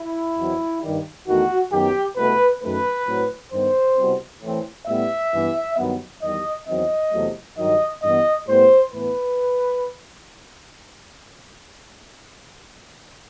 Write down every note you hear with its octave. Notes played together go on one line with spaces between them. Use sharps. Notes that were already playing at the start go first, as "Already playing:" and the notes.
Already playing: E4
E2 B2 F#3 C4
G2 D#3 G3
E2 D#3 A3 F#4
F#2 D#3 F#3 B3 G4
C2 B2 A3 B4
F#2 D#3 A3 B4
A2 F#3 C4
G2 D#3 G3 B3 C5
C2 B2 G3 C4
A2 E3 A3 C4
A2 G3 B3 E5
G2 E3 B3
G2 D#3 F#3 B3
E2 D#3 G3 D#5
E2 D#3 F#3 C4 D#5
E2 C3 F#3 A3
G2 D#3 F#3 D#5
G2 E3 B3 D#5
A2 G3 B3 C5
A2 E3 B3 B4